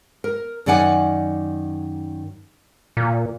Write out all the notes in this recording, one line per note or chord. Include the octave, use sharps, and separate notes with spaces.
A#4
F#2 D#3 D5 F#5 G#5
A#2